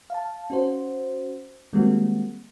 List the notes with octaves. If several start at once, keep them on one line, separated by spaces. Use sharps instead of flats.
F5 A5
C#4 F#4 C5
D#3 G3 G#3 A#3 C4 F#4